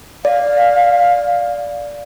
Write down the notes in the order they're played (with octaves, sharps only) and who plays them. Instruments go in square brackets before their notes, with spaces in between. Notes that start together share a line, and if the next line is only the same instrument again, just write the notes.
[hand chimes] D5 [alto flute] F5